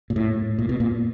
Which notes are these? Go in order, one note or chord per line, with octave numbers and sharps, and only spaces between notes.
A#2
A2
A#2
B2
A#2